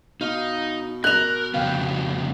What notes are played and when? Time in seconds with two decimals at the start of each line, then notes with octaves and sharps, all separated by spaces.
0.21 B2 D#4 F5 D#6
1.04 A#4 F#6 F7
1.54 F2 C#3 B3 F5 G5